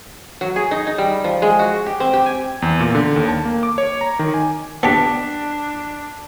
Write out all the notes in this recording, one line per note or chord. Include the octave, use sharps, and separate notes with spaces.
F#3
G#4
D#4
D#4
G3
F3
G#3
F#4
G4
C4
G4
G#5
E2
A#2
D3
D#2
A5
A#3
D6
C#5
A#5
D#3
G#5
B3 D4 G4 A5 B6